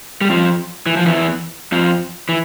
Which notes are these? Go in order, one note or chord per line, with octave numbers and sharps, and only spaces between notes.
G3
F2 F3
E3
F3
E2 E3
F2 F3
E3